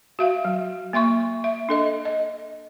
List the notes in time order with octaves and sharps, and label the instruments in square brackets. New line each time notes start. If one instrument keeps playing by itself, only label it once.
[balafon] F#4 E5 F5
F#3
A#3 E5 C6 C#6
E5
D4 A4 D#5
D#5